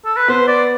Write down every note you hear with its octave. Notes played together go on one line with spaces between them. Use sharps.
A4
B4
B3 C5
D5